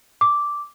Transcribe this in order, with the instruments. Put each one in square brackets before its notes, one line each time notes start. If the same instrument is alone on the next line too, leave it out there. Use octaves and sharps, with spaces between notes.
[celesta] D6